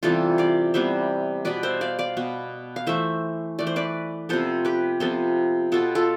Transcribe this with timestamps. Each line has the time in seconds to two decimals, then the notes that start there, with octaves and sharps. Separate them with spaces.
0.03 C3 E3 G3 B3 F4 A4
0.38 D5 F5
0.74 C3 E3 G3 B3 C5 E5
1.45 B2 B3 B4 D5
1.63 C5 E5
1.81 D5 F5
1.99 D5 F5
2.17 B2 B3
2.76 F5
2.87 E3 A3 C5 E5
3.59 E3 A3 D5
3.67 C5
3.76 B4 D5
4.29 C3 F3 B3 A4 C5
4.65 G4 B4
5.00 C3 F3 B3 A4 C5
5.72 B2 B3 F4 A4
5.95 F4 A4